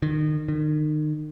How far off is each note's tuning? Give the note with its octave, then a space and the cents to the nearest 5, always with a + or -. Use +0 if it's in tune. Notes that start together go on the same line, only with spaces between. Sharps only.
D#3 -30
D#3 -35